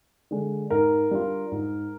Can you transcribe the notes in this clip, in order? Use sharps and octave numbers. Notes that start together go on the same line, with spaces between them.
D3 G#3 D4
G#2 A#4
G3 D4 F4
G#2